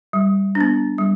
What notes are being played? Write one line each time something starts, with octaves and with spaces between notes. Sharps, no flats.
G3
D4
B3
G3